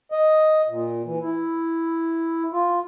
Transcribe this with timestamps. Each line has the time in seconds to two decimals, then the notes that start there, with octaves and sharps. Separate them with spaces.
0.12 D#5
0.69 A#2
1.05 E3
1.21 E4
2.52 F4